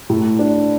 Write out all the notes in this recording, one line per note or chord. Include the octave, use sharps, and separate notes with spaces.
A2
D4